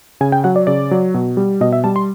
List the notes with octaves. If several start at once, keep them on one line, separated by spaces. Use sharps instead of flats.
C#3 G#5
G5
F#3 F#5
D5
C#3 D5
F#3
B2
G3
B2 D#5
E5
G3 A5
C6